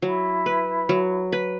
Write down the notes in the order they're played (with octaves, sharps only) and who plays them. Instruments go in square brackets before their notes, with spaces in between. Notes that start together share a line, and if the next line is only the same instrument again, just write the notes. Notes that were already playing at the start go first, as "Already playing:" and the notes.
[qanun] F#3 [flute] E4
[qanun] B4
F#3
B4